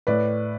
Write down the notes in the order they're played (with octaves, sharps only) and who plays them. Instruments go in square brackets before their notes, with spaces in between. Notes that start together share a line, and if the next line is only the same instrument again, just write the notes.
[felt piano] A2 B4 D5